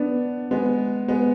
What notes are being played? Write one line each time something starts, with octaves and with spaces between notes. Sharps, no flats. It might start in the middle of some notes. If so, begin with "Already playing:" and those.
Already playing: B3 D4
G#3 B3
G#3 B3